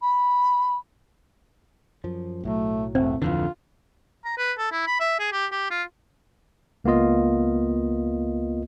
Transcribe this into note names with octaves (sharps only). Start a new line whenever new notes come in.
B5
F#2 F3
B1 A2 F#3 A3
E1 A3 C4
D1 F2 D3 E3 F4
A#5
B4
A4
E4
B5
E5
G#4
G4
G4
F4
C#2 A#3 B3 F4 D#5